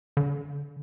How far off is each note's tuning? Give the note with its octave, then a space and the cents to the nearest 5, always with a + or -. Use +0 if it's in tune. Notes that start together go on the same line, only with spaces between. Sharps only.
D3 -25